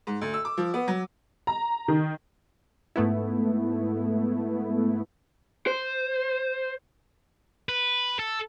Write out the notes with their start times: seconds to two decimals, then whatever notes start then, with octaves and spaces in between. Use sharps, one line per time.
0.07 G#2
0.21 D2
0.34 E6
0.45 D6
0.57 F3
0.74 B3
0.88 F#3
1.47 A#5
1.88 D#3
2.96 G#2 A3 B3 E4
5.67 C5
7.69 B4
8.19 A4